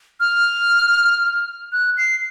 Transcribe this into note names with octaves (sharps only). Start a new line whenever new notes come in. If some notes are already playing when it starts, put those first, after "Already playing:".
F6
F#6
C7